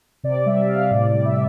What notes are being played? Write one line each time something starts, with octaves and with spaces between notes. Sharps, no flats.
C3 D5
G3 E5
C3 F5
A2 D5
D5
G3
E5